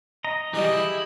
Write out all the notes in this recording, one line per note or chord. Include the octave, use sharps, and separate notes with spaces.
D#5 A#5
E3 G3 G4 G#4 D#5
E4